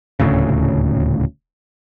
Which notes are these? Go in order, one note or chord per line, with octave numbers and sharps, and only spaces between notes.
D#1 D2 A2 C#3